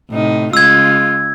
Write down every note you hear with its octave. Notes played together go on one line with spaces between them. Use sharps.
A2 C3 D#4
C#3 G#3 F4 E6 G#6